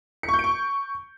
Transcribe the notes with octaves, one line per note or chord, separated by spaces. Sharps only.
C#7
C#6
G6
D7
C#6